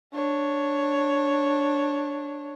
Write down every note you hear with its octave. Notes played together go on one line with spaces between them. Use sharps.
D4 C#5